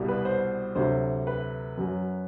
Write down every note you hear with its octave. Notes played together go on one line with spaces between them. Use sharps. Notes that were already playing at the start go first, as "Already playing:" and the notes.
Already playing: C2 B2 G3
B4
C5
D2 C3 F#3 C5
B4
F#2 F#3